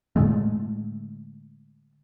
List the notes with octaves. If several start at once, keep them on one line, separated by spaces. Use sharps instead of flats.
A2 D3 G#3 A3